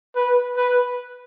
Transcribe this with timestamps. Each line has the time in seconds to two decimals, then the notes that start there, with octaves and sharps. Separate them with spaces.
0.16 B4
0.56 B4